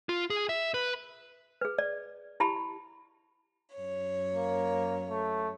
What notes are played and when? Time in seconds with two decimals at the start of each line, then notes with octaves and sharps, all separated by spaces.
0.09 F4
0.30 G#4
0.49 E5
0.74 B4
1.61 G#4 B4
1.78 D5
2.40 E4 G4 A5 B5
3.75 F#2 C#5
4.35 A#3
5.09 A3